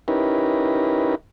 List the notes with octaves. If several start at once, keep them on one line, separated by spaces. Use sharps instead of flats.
C#4 D#4 E4 G4 A#4 B4